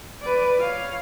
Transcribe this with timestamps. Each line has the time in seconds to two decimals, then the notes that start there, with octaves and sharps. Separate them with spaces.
0.22 B4 D5
0.59 C#5 F5